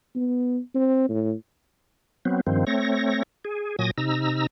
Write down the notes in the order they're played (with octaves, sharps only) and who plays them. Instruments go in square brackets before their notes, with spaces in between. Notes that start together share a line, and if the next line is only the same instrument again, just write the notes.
[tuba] B3
C4
A2
[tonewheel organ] F#3 B3 C4
G2 D#3 F3 C4
A3 C4 C#5 A#6
G#4
A#2 F#3 G#5 D#6 A#6
C3 D#4 A#5 E6